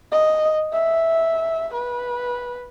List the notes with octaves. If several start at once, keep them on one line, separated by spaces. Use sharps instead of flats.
D#5
E5
B4